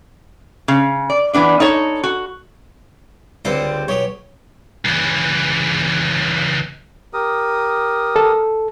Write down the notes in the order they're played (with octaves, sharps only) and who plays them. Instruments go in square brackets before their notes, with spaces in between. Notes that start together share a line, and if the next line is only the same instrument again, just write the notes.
[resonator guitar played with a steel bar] C#3
D5
E3 B3 D4 D5
D#4 A4 C#5
F#4
[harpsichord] C#2 C5 D6 [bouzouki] D3 G3 C4
[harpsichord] B1 G4 G#4 [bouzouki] C#5
[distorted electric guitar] C#2 E3
[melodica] G4 A#4 D#6
[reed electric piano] A4